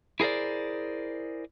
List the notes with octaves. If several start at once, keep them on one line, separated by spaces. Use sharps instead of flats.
E4 G#4 A#4 C5 D5